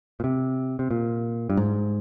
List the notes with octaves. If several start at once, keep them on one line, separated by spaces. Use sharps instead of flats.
A#2
C3
C3
A#2
G2
G#2